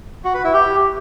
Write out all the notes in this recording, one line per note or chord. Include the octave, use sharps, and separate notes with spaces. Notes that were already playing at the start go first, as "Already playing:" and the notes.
F#4
B4
E4
G4